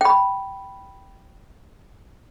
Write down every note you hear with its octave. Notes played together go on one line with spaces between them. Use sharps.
G5 B5